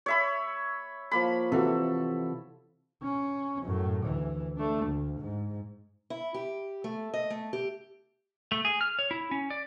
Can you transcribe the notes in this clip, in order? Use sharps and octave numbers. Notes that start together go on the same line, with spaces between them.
C#5 E5 B5
F3 A#3 B5
C3 E3 F#4 A4
C#4
F#2 A2
D2 E3
A3 D4
D2
G#2
E4
G4
A3
D#5
A3
G4
A3
G#4
F6
C#5
E4
C#4
D5